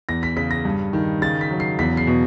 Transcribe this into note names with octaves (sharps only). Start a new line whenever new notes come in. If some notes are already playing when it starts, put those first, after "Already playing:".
E2 A#6
B6
C#3 B6
A#6
G2
D#3
C#3 A6
B6
F#3
C7
E2 B6
C7
B2